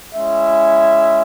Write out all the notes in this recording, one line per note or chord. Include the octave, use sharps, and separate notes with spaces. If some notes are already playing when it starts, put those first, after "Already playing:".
G#3 C#4 E4 E5